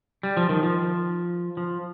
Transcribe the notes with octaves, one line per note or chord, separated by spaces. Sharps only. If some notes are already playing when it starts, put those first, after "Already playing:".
G3
F3
D#3
F3
F3